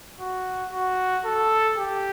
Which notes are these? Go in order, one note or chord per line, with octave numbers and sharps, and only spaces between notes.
F#4
F#4
A4
G4